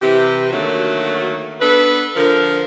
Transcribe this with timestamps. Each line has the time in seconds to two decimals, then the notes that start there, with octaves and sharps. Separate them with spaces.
0.02 C3 E3 G4
0.51 D3 D#3 F#3 A3 A#3 F#4
1.60 B3 D4 A4 B4
2.16 D3 F3 A#4